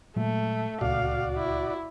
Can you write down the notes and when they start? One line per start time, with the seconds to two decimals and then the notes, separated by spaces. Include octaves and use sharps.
0.16 A#2 F#3 G#3 A3
0.81 D1 C#2 A#2 F#4 D5 F5
1.36 E4